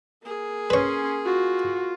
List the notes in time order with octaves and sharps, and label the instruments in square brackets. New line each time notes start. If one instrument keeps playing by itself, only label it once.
[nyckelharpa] A#3 G#4
[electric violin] C#4 C6 [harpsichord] B4 C#5
[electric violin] F4 [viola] F#4